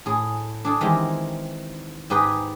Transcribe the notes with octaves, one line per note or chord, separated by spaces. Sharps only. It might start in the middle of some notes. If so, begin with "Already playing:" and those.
A2 G#4
D4 G#4 A4
D#3 E3 G#3 C4 G4
G#2 G4 G#4 B4 D#5